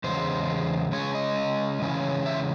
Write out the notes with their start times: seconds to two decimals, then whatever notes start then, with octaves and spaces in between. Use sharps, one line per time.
0.04 E2 C#3 G#3 C5
0.92 C#3 G#3 C#4 C#5
1.15 D#5
1.82 C#3 E3 G#3 C#4
2.26 E5